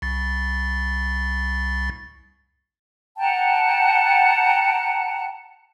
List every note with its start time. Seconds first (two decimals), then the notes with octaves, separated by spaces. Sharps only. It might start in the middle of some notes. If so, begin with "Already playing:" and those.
0.02 C2 A6
3.18 F#5 G5 A5 A#5